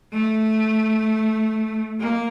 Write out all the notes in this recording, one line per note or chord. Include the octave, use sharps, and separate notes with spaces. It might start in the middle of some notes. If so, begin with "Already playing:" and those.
A3
A#3